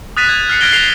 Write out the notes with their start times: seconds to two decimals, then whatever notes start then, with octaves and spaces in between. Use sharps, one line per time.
0.17 D#6 F#6 A6 B6 D#7 E7
0.29 G#6
0.49 F6 G#6 C7 C#7
0.61 F6 G#6 A#6 D7 G7
0.73 C7 F7